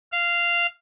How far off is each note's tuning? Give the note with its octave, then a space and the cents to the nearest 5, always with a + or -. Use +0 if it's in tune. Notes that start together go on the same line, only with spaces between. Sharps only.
F5 -10